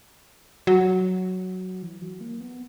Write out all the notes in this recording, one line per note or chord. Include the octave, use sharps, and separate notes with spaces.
F#3
E3
F#3
A#3
B3